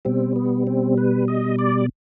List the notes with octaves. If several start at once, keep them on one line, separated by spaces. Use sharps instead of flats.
B2 G3 C4
B3
C4
B4
D#5
D5